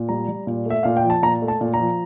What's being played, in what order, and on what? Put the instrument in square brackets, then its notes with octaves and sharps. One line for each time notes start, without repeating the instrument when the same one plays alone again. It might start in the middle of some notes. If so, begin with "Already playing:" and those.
Already playing: [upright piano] A#2
G3 A#5
G3
A#2
A3 E5
A#2 F5
G5
F3
A5
A#2 A#5
A3
A5
A#2
A#5
F3